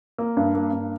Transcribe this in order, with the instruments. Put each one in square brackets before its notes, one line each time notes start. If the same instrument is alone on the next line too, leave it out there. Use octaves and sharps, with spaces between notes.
[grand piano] A#3
G2
A#3
G2